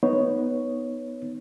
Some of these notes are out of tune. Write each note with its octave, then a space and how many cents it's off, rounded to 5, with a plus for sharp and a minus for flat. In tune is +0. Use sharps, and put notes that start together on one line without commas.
B3 +0 D#4 +0 C#5 +0